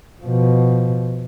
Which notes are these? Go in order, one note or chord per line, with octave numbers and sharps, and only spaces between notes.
B2 F3